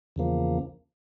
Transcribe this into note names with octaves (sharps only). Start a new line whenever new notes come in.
E2 C#3 F3 A#3